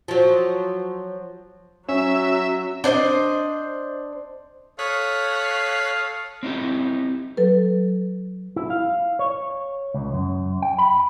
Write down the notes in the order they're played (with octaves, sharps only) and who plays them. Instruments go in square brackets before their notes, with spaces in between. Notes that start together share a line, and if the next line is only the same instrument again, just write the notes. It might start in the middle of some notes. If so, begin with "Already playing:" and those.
[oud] F3 F#3
[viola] F#3 [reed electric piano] C#4 [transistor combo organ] E5
[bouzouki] D4 C5 D5 D#5
[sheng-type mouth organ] A4 C#6 D#6 [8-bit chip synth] C#5 F#6 B6 [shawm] F5
[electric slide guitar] C4 D#4 E4 G4
[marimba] F#3 A4 B4
[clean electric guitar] E4
F5
C#5
C#2
F#2
G5
B5